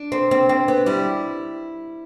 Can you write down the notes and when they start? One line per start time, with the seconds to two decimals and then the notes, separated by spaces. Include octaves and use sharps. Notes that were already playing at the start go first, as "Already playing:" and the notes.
Already playing: D4
0.12 C4
0.31 C4
0.49 C4
0.68 B3
0.86 G3 E4